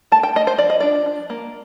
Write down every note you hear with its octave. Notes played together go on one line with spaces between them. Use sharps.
A3 A5
G5
A3 D#5
C5
F3 D5
D#5
D4 D5
D4
A#3